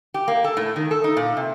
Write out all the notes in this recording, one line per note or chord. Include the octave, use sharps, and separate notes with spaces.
G4
A#3
A4
A2
D#3
A4
D#4
A#2
C3